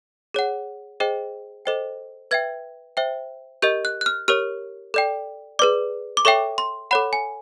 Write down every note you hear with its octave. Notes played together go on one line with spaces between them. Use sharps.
G#4 C#5 F#5
G#4 C5 D#5 G5
A4 C5 D#5 G5
B4 E5 G5 G#6
C5 E5 G5
G4 A#4 D#5 G6
F#6
F#6
F6
G4 A#4 C#5 F6
A4 D5 G5
G#4 B4 D5 D6
D6
A4 C#5 E5 G5 C#6
C6
A4 C#5 F#5 B5
G#5